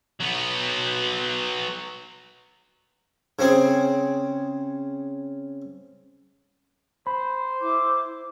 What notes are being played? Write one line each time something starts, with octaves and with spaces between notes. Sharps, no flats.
F#3 B3
C#3 C4 G#4
C5 B5
E4 D6